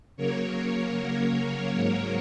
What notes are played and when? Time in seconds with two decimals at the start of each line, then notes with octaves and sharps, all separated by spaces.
0.17 C#3 F#3 A#3 A#4 C#5
1.74 G#2 F#3 A#3